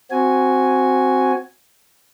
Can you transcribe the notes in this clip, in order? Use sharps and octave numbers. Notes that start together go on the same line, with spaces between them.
C4 F#4 G#5